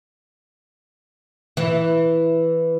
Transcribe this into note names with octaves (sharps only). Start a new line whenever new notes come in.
E3